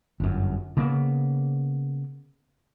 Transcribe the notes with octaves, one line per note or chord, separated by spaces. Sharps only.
G1 F#2
C#3 A#3 B3